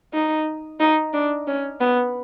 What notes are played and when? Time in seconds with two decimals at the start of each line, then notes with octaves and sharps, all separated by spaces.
0.14 D#4
0.80 D#4
1.13 D4
1.47 C#4
1.80 B3